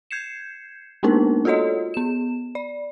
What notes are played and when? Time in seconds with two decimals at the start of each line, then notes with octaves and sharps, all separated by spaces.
0.11 G6 G#6 C7 C#7 E7
1.03 G#3 A#3 B3 D4 D#4 A#4
1.45 F4 F#4 A4 C#5 D#5
1.94 B3 E7
2.55 D5